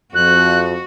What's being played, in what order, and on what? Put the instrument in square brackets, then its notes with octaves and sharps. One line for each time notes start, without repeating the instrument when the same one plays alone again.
[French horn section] F2 [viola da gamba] F#4 [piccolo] F#6